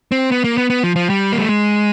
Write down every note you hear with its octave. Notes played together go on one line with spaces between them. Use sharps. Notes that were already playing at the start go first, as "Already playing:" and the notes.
C4
B3
A#3
B3
B3
F3
F3
G3
A#3
A3
G#3